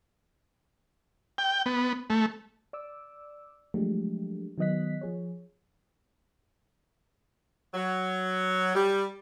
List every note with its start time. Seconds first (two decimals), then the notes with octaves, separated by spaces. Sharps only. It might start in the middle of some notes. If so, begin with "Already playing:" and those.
1.38 G5
1.66 B3
2.10 A3
2.73 D5 D6 E6
3.74 F3 F#3 G#3 A3 D4 G4
4.58 D#3 F#3 B3 D#5 F#6 B6
5.01 F3 G#4 C#5
7.74 F#3
8.75 G3